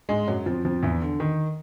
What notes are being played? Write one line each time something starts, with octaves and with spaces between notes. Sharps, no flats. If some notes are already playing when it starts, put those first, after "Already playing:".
G#2 G#3
F#2 F#3
F2 F3
F2 F3
E2 E3
D3
D#3